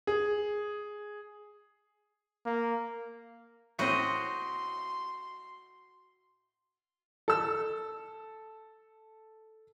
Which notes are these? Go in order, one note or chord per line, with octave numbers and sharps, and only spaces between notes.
G#4
A#3
A2 C4 F#4 D#5 C6
A4 E6